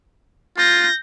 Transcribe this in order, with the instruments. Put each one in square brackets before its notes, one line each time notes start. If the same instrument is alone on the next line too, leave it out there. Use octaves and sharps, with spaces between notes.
[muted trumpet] F4 [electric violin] G6 A#6